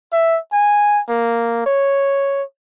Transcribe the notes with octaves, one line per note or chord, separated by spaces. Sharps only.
E5
G#5
A#3
C#5